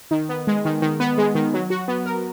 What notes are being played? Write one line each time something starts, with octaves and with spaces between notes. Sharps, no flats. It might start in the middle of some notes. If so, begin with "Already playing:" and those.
D#3
B3
G#3
D#3
D#3
B3
G#3
D#3
F#3
F#4
B3
A#4